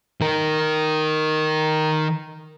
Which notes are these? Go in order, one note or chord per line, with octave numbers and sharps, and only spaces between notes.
D#3 A#4